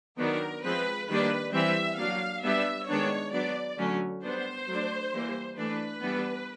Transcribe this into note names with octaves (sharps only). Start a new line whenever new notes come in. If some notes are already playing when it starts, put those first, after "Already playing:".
D#3 F#3 B3 D4 A#4
F3 G#3 C4 B4
D#3 G3 A#3 D4 B4
E3 G3 C4 E5
F#3 A#3 D4 F5
G3 B3 D4 E5
D#3 G#3 B3 D4 C#5
F#3 B3 D4 D5
D3 F#3 A3 C#4
G3 B3 D4 C5
F#3 A3 D4
E3 G3 A#3
E3 A3 D4 B4
E3 G3 B3 D4